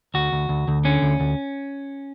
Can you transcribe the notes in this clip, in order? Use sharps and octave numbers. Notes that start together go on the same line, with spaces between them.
D2 F#4
D2
D2
D2
D3 C#4
D2
D2